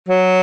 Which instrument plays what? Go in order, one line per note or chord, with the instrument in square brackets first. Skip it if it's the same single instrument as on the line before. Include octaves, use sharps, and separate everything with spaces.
[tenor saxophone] F#3